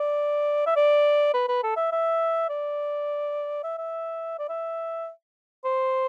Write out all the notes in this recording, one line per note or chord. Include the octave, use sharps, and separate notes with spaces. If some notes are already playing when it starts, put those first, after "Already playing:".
Already playing: D5
E5
D5
B4
B4
A4
E5
E5
D5
E5
E5
D5
E5
C5